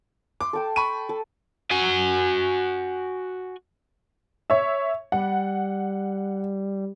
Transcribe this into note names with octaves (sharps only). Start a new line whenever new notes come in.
C6 D6
A4 G5 A5
B5 C#6 D#7
A4
F#4 G#5
C#5 E5
G3 F#5